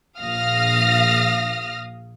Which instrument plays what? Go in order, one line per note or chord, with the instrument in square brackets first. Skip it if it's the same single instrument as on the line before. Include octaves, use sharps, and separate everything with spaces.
[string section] A#1 F5 D#6 F6 A#6